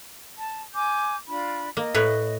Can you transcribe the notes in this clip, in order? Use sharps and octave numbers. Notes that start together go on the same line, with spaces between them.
A5
G#5 D6 G6
D4 F4 B5
A#3 D#5
A2 B4 C#5